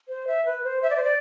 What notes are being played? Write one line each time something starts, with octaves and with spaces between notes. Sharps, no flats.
C5
E5
B4
C5
E5
D5
C5
D5